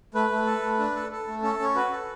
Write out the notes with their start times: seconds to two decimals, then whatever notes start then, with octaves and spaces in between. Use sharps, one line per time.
0.14 A3 B4
0.30 A3
0.46 A4
0.62 A3
0.79 D4
0.95 A4
1.12 A4
1.28 A3
1.43 C#4 A4
1.59 C#4 C#5
1.75 F#4 B4
1.91 A4